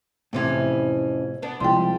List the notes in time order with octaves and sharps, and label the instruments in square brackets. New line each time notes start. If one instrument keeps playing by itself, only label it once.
[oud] F2 E3 C#4 [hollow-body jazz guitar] A2 C3
[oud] B3 D4
[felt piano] C2 F3 G#3 [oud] G3 [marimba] G5 C6